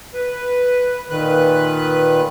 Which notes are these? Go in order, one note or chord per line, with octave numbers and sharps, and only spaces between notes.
B4
A#2 D#3 B4 F#6